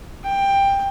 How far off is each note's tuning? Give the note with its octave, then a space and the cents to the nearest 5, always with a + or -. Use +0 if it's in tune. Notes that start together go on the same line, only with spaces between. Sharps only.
G5 +15